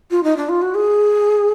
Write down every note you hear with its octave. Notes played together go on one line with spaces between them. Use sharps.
F4
D#4
D4
F4
F#4
G#4